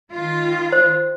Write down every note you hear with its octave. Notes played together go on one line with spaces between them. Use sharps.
D#3 F4
C5